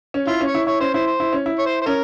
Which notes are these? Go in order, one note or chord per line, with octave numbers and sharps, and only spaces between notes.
C#4
E4 F4
C#4
C#5
E4
E4 C#5
C#4 C5
E4 C5
C5
E4
C#4
E4
C#5
C5
C5
C#4 A#4